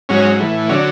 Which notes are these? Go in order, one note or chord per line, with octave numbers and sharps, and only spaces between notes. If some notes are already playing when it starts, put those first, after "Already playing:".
G#2 F#3 C#4
A2 E3
D3 F#3 C#4